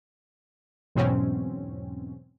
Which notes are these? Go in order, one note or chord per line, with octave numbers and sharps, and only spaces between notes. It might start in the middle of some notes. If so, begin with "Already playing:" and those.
E2 G#2 B2 F#3 C4 C#4